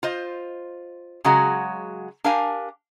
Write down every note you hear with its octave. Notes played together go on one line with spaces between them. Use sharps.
F4 C5 D#5
C#3 F#3 G#3 F#4
D4 G4 A#4 F5 G#5